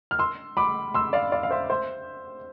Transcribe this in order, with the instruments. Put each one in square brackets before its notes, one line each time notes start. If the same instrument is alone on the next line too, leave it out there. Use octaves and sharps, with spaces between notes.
[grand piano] F6
C6 E6
B5 D6
C6 E6
D5 F5
D5 F5
F5
C5 E5
C5 E5